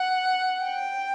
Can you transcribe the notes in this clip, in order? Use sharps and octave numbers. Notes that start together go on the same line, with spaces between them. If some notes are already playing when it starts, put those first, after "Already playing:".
Already playing: F#5
G5